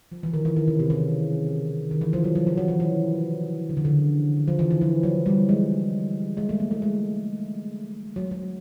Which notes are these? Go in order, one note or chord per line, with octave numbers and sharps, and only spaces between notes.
F3
E3
D#3
E3
D#3
C#3
C3
C#3
D#3
E3
F3
F#3
F#3
F3
F#3
E3
E3
D3
C#3
D3
F3
E3
E3
F3
F#3
G3
G#3
G#3
A3
A#3
A3
G#3
F#3
F#3